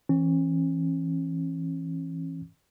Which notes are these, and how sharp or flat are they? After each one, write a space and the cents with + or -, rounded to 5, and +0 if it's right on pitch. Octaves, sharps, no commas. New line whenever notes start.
E3 +0 C#4 -35